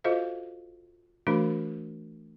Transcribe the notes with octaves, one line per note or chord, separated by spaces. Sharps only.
F4 F#4 A4 C5 D#5 F5
E3 A3 D4 F#4 A#4 B5